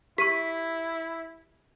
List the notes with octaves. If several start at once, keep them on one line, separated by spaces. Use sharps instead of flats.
E4 G4 C#6 B6 D#7